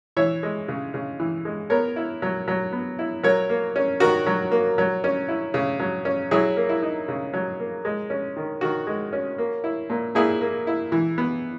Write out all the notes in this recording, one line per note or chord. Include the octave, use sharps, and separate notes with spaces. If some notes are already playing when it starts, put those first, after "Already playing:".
E3 C#5 E5
G#3
C#3
C#3
E3
G#3
B3 A#4 C#5
E4
F#3
F#3
B3
E4
F#3 A#4 C#5
A#3
C#4
D#3 F#4 A#4
F#3
A#3
F#3
C#4
E4
C#3
F#3
C#4
F#3 E4 G#4
A#3
E4
D#4
C#3
F#3
A#3
G#3
C#4
D#3
D#3 F#4
G#3
C#4
A#3
E4
A#2
A#2 E4 G#4
A#3
E4
E3
B3